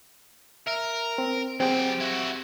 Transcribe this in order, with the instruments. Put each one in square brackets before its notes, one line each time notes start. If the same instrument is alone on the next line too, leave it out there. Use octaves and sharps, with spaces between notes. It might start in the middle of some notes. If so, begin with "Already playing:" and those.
[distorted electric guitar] A#4 [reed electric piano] E5
[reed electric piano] C4
[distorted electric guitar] F#3 G5 [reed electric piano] C4 G4 G#4
[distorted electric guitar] E4 F#4